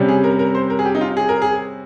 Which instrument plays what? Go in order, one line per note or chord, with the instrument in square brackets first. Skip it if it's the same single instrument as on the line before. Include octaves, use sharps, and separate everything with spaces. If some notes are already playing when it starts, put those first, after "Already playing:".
Already playing: [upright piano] C3 G3 C#4
[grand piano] G#4
A#4
A#4
C5
A#4
G#4
G4
D#4
F4
G#4
A#4
G#4